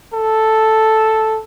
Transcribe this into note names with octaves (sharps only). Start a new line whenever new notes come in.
A4